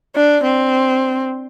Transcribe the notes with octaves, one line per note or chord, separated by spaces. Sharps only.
D4
C4